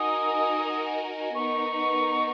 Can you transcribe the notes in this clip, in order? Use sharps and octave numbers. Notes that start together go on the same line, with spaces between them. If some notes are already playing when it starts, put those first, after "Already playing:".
Already playing: D#4 F#4 A#4 D#5 G#5 D#6
B3 D#4 A#4 C#6